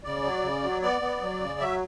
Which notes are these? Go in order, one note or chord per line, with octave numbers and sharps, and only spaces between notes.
C#3 D5
F#3
C#3
F#3
B3 D5
B3
F#3
C#3
F#3 E5